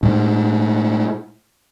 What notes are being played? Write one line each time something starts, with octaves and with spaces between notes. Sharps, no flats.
A2 G#3